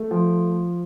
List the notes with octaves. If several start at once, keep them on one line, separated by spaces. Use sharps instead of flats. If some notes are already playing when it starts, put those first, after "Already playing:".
Already playing: A3
F3